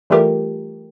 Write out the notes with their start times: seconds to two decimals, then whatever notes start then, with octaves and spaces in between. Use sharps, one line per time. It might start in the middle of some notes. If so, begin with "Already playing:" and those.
0.10 E3 G3 A3 F4 G4 A#4